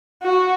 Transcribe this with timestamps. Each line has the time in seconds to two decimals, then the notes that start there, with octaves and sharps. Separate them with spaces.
0.23 F#4